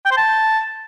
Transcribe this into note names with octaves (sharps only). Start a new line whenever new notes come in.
G5
C5
A5